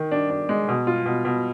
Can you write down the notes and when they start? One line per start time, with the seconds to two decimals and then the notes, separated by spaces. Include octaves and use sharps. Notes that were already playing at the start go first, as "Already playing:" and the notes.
Already playing: D#3
0.11 D4
0.30 D4
0.49 G#3
0.69 B2
0.87 F4
1.06 B2
1.25 B2